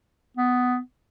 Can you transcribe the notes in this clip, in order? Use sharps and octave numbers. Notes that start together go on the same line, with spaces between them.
B3